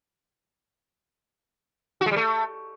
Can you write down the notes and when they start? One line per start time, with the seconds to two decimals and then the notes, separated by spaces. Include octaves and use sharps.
2.01 F#4
2.06 G#3
2.11 G3
2.16 A3